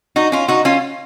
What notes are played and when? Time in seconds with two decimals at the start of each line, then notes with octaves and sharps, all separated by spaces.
0.16 D#4 F#4
0.32 C#4 F4
0.48 D#4 F#4
0.65 C#4 F4